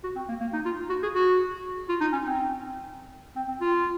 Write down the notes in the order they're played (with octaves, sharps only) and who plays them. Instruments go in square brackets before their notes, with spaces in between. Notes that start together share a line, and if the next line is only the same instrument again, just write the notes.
[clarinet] F#4
C4
A#3
A#3
D#4
F4
F#4
G#4
F#4
F4
D#4
C#4
C4
C4
C4
F4